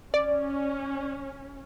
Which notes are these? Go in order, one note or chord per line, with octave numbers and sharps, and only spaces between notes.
C#4 D5